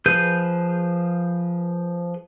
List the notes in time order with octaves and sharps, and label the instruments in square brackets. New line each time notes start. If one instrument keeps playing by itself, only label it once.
[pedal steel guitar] F3 G#4 B4 G6